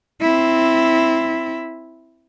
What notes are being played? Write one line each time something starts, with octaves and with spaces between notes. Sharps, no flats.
C4 E4